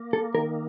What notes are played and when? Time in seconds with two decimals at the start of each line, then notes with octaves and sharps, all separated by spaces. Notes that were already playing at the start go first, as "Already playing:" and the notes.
Already playing: A#3
0.13 A4
0.35 D#3 A#4